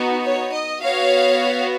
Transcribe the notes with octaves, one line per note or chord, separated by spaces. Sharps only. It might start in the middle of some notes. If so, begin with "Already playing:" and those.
Already playing: B3 D#4 F#4
C#5
D#5
B3 F#4 C#5 F5